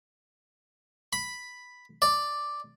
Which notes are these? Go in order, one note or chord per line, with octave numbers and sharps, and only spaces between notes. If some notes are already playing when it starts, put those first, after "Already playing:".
B5
D5